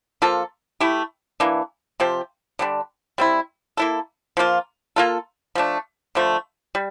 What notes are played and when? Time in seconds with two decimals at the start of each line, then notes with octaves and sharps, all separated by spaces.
0.22 F3 A#3 F4 A4
0.80 A3 E4 G4
1.40 E3 A#3 D4
2.00 C3 F3 C4 G4
2.59 D3 G3 D4
3.18 G3 C4 E4
3.77 A#3 E4 A4
4.37 F3 A#3 F4
4.96 A#3 F4 A4
5.55 F3 A3 D4
6.15 D3 F3 A3
6.75 G3